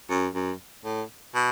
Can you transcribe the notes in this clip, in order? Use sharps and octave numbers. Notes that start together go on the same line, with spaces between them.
F#2
F#2
A2
B2